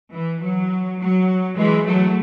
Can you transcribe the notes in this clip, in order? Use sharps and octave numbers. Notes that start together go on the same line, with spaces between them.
E3
F#3
F#3
E3 G#3
F#3 A3